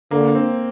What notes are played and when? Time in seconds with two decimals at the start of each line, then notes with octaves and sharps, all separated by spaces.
0.11 D3 A#3
0.35 C4